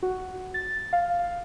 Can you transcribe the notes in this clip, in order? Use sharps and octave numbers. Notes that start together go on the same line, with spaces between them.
F#4
A6
F5